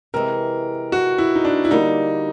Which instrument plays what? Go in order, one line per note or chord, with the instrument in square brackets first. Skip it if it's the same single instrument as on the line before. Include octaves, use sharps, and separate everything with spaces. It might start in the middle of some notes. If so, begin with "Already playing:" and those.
[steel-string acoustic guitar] C3 E3 G#3 [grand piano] A#4
[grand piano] F#4
E4
D#4
D4
E4
[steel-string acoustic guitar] D3 G3 A#3 [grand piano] D#4